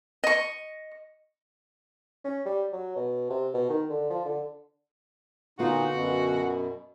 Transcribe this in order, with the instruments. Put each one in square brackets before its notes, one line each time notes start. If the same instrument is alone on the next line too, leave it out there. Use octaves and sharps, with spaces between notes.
[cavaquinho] D#5 C#6
[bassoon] C#4
G3
F#3
B2
C3
B2
D#3
D3
F3
D3
[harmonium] A#2 D#4 [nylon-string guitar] D3 B3 F4 [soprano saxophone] F#4
[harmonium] F#2 B2